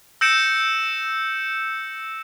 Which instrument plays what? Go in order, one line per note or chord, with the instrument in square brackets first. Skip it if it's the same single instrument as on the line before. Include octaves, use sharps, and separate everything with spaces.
[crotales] E6 G6 A#6 C#7 D7 E7